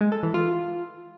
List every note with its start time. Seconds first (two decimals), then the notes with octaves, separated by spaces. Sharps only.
0.01 G#3
0.12 A4
0.23 E3
0.34 F4